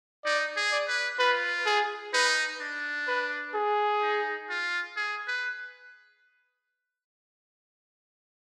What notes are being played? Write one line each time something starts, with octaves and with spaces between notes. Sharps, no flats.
D#4 D5
G#4
D5
B4
F4 B4
G#4
D#4 B4
D4
B4
G#4
D#4
F4
G#4
B4